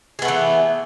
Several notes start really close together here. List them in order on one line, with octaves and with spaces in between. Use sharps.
G#4 B3 A3 E3